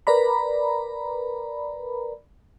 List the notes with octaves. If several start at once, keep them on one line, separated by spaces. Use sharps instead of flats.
A#4 B4 D5 A#5 B5